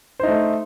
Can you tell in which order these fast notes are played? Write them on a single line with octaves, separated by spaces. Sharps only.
C5 D#4 A3